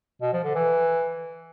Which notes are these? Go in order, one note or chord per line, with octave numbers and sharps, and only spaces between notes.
B2
F3
D3
E3